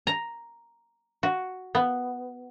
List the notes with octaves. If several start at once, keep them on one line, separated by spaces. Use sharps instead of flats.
A#5
F#4
B3